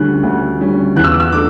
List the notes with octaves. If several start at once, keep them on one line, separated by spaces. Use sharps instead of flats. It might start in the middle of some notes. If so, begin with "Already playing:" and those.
Already playing: D2 D3 G3 C#4 F#6
D2
D3 G3 C#4
E2 F#6
E6
D6
E6
A3 D4 D6